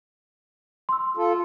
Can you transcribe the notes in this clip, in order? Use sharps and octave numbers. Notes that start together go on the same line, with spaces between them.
C6 E6
F4 A4